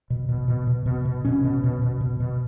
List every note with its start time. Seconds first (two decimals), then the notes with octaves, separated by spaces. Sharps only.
0.10 B2
0.29 B2
0.48 B2
0.67 B2
0.86 B2
1.05 B2
1.25 B2 C#4
1.44 B2
1.64 B2
1.82 B2
2.01 B2
2.20 B2